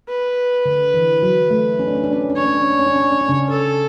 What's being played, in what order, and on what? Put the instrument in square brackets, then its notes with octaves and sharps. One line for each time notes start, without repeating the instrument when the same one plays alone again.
[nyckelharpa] B4
[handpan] D3
E3
F#3
A3
C#4
D4
C#4
D4
C#4
D4
C#4
[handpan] D4 [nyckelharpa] C#5
[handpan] C#4
D4
C#4
D4
C#4
D4
C#4
D4
C#4
D4
C#3 C#4
[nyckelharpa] A4